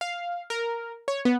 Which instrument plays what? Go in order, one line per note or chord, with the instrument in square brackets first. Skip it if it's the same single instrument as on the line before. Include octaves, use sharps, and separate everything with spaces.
[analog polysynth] F5
A#4
C#5
B3